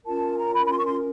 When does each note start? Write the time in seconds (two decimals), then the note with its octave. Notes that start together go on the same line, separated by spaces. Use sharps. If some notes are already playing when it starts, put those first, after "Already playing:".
0.05 C#4 F4 A#4 A5
0.37 A#5
0.54 B5
0.66 B5
0.70 C6
0.78 C#6
0.86 C6